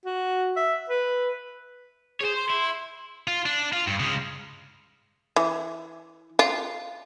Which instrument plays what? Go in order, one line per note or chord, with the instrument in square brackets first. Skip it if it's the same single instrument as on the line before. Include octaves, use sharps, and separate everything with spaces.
[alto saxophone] F#4
E5
B4
[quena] G#4 [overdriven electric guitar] C5 C#5
[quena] C6
[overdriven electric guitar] E4
[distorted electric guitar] F4
D4
F4
G2
C#3 G#3
[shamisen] E3
F4